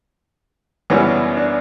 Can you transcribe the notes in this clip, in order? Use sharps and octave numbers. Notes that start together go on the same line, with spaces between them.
F#2 C#3 E3 G3 B3 C#4
D4